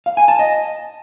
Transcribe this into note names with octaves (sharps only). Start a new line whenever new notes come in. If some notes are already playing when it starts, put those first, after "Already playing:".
F5
G#5
A5
D#5